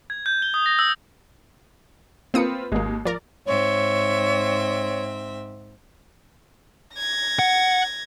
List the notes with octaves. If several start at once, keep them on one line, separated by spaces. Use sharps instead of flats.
G#6
G6
G7
D#6
A#6
E6
A#3 C4 F4 B4 D#6 C#7
G#1 D#2 G#3 A#3
F3 A#4 D5
G#2 C4 C#5 E5
G#6 A#6
F#5